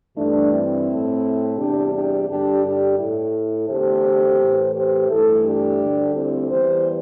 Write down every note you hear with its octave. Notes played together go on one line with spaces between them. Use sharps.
G2 E3 G3 A3 D4
C4 E4
A2 A3
E2 C3 G3 D4 G4
D4 G4
G2 D3 G3 D4 G4
D4 G4
A2 A3 E4 A4
E2 D3 A3 G4 C5
A2 E3 A3
G4 C5
G2 E3 A3 E4 A4
D4 G4
D2 D3 G3
C4 E4
E2 E3 G3 G4 C5